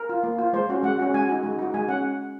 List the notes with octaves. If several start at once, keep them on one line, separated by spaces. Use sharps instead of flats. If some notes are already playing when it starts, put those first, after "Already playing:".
Already playing: A#4
F4
A#3
F4
G#3 C5
C#4 F#4
G#3 F#5
C#4 F#4
G#3 G#5
D#4 F#4
G#3
D#4 F#4
G#3 G#5
C#4 F#5